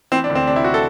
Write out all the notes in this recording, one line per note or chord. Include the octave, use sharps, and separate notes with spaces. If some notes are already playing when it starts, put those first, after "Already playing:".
E3 C4
D4
D2
C4
C3 D4
E4
F#4
A4